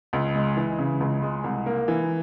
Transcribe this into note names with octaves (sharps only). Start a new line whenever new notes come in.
C#2
G#3
E3
C#3
C#2
G#3
C2
A#3
E3